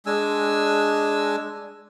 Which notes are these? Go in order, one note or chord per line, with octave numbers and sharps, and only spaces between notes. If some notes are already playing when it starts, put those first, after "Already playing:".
G#3 D4 G#5 E6